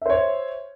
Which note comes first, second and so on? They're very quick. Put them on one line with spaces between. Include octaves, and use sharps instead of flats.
E5 C5 C#5